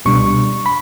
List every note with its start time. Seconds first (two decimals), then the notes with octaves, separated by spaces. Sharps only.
0.05 C#2 B2 G3 D4 C#6
0.66 B5